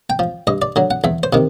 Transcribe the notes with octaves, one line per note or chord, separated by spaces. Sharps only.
G5
F3
G2 D#5
D5
D3 F#3
F#5
E2 E5
C5
C3 D#3